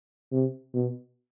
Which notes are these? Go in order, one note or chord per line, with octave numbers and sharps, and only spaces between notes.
C3
B2